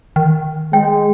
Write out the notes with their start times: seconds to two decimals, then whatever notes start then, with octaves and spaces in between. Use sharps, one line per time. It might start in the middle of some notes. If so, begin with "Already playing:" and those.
0.16 D#3
0.73 G#3 G5